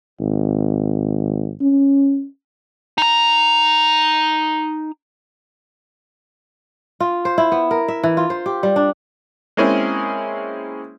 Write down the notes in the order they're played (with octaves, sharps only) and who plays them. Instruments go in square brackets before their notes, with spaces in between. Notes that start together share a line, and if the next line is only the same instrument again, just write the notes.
[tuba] G#1
C#4
[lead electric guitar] D#4 A#5
[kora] F4
C5
E4
B3
A#4
E5
E3
F4
C5
G4
G3
D4
[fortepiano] G#3 A#3 C4 C#4 E4 G#4